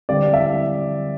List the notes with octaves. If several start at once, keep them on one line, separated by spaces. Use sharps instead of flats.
D3 G3 C4 G4 D5
E5